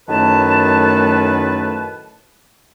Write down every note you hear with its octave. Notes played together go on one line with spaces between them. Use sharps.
F#2 A2 D#3 A3 B4 A5